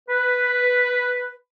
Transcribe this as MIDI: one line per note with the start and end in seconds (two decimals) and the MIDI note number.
0.09 1.33 71